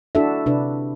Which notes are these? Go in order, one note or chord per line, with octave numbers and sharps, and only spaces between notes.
D4 E4 F#4 A4 E5
C3 D4 B4